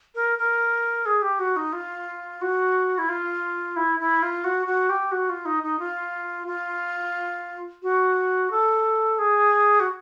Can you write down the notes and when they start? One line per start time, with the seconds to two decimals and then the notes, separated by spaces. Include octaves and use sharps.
0.15 A#4
0.38 A#4
1.06 G#4
1.22 G4
1.39 F#4
1.56 D#4
1.73 F4
2.41 F#4
2.98 E4
3.09 F4
3.76 E4
4.00 E4
4.22 F4
4.44 F#4
4.66 F#4
4.89 G4
5.11 F#4
5.29 F4
5.45 D#4
5.63 D#4
5.79 F4
6.47 F4
7.82 F#4
8.51 A4
9.18 G#4
9.80 F#4